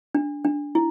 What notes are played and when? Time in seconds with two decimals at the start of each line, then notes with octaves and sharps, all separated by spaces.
0.15 D4
0.44 D4
0.75 E4